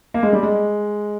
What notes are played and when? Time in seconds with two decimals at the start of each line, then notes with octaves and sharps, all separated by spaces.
0.14 A#3
0.23 G#3
0.33 G3
0.43 G#3